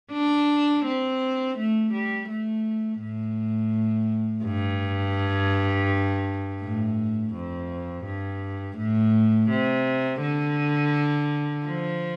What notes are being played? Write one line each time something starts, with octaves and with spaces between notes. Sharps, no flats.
D4
C4
A3
G3
A3
A2
G2
A2
F2
G2
A2
C3
D3
F3